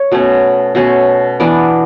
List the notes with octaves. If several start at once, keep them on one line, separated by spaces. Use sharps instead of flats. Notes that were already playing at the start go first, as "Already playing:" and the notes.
Already playing: C#5
B2 A3 C#4
B2 A3 C#4
E3 B3 D4 D5